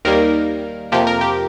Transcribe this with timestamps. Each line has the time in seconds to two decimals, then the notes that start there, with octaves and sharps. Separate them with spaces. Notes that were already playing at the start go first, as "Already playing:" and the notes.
0.05 D#2 D#3 G3 A#3 A#4
0.92 F2 C3 F3 A#3 G4
1.07 A#4
1.21 G4